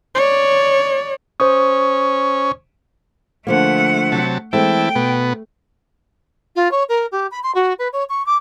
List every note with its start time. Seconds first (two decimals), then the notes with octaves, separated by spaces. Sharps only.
0.15 C#5 D5
1.40 C#4 C5 D#6
3.47 D3 F3 A3 A#3 F#5
4.12 C3 F#3 A5
4.53 E3 G#3 A3 C4 E4 G5 A5
4.96 B2 A3 B3
6.55 F4
6.71 C#5
6.88 A#4
7.11 G4
7.31 B5
7.43 C6
7.54 F#4
7.78 B4
7.92 C#5
8.09 C#6
8.25 D6